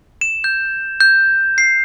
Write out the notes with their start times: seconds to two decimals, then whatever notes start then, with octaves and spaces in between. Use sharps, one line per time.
0.21 E7
0.44 G6
1.00 G6
1.58 C7